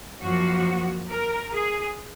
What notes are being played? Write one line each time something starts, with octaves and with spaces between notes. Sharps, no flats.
F#2 F3 A#3 F#4
A#4
G#4